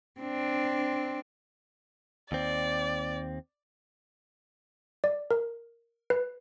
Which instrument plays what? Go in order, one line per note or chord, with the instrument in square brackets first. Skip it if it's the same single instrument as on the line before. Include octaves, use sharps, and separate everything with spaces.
[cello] C4 D4
[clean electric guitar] D#2 C4 [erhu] D5
[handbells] D5
A#4
B4